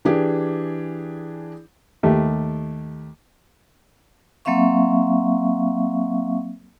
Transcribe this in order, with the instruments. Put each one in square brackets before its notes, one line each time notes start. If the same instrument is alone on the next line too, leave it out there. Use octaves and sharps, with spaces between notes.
[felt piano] E3 D4 G4 G#4
[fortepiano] D#2 A3 G4
[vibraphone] F#3 A#3 C4 E5 F5 C#6